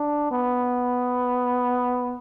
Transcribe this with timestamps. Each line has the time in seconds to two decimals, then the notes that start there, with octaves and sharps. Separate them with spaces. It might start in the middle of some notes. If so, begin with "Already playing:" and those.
Already playing: D4
0.31 B3